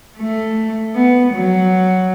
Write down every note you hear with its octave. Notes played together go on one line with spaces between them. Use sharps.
A3
B3
F#3